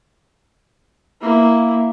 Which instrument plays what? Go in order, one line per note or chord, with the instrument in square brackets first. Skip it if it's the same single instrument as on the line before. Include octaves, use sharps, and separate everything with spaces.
[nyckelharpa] A#3 E4